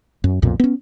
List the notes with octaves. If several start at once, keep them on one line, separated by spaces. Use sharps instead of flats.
F#2
B1 F2 A#2
B3 C#4